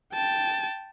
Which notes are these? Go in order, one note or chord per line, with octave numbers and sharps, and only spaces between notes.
G5 A5